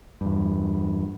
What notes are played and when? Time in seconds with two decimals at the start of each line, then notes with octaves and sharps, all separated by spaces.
0.21 E2 G2